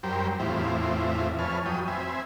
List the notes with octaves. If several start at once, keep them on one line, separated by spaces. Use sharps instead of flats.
F#2 G3 A#4 C5 G5
E2 A2 C4 E4 F4
F2 B4 C#5 G#5 A5 F6
F2 F#3 G5 D#6
C4 E5 G#5 B5